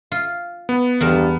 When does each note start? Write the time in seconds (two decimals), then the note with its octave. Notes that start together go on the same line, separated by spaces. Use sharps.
0.12 F4
0.69 B3
1.00 E2 G2 A#4 A5